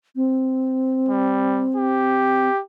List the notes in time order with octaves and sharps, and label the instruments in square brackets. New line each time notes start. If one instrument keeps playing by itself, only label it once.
[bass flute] C4
[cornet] G3
G4